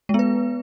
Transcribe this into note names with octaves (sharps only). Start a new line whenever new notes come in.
G#3 B3 B4